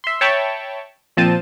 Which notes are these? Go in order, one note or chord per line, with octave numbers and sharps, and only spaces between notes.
E5 C6
C#5 E5 G5 A5 B5 C#6
A#2 F3 C4 A5 D#7